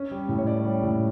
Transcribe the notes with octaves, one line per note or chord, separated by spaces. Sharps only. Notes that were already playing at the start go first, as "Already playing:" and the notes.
Already playing: C#4
G3
A2
C#5
C#4 D5
G3
A2